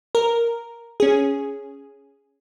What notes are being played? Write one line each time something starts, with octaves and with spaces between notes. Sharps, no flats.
A#4
C#4 G#4